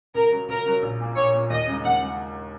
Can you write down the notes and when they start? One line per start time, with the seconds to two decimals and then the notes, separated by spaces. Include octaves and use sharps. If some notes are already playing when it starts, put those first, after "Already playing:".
0.15 C#2 A#4
0.31 C#3 F#3
0.48 C#2 A#4
0.65 C#3 F#3
0.82 A#1
1.00 A#2 A#3
1.16 A#1 C#5
1.33 A#2 A#3
1.50 D#2 D#5
1.67 C#3 G#3 D#4
1.84 D#2 F#5
2.01 C#3 G#3